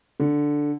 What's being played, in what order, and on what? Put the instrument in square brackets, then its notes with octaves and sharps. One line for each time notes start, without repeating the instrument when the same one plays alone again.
[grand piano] D3